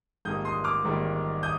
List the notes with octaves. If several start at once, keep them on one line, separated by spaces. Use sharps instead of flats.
A#1 G#2 D#3 G3 A#3 D#6 G6
C6 D#6
D6 F6
A#1 G#2 D#3 G3 A#3
D#6 G6